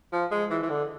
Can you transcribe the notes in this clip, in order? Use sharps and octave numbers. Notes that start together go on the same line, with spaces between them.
F3
G#3
E3
E3
D3